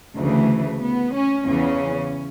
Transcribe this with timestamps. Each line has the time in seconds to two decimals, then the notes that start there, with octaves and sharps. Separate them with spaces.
0.16 D2 C#3 E3 A3
0.82 B3
1.15 C#4
1.47 E2 C#3 E3 C#4